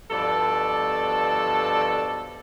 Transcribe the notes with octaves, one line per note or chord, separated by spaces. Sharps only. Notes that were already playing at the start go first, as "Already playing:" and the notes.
G2 B2 F3 A4 D5 A5